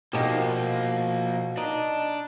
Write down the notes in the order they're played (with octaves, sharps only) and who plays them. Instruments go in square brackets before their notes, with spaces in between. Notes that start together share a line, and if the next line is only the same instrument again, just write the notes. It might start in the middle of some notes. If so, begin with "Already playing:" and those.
[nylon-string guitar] B2 [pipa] D#3 G4 [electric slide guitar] F3 A#3
[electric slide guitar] D4 [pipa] D#4